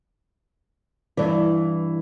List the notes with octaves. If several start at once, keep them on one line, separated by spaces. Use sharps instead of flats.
G2 E3